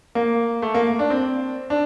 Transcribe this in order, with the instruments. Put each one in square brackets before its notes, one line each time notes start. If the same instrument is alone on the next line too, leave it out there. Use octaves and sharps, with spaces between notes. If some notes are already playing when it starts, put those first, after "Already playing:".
[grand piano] A#3
A3
A#3
D4
C4
D4